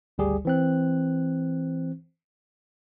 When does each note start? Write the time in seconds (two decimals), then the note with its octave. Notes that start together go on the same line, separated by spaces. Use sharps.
0.18 G#1 D2 G3 G4 G#4
0.45 E3 C4 F#6